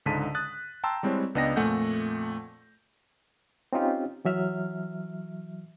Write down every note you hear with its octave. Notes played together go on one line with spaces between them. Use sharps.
C#2 G#2 D3 A5 B6 D#7
D#6 F#6 A6
G5 A5 A#5 C6 E6
G3 G#3 C4 E4 C#5
C#2 B3 D4 D#5 G5 A#6
F2 A#2 A3 F#5 G#5 G6
C4 C#4 D#4 F4 G4
E3 F#3 E5 F6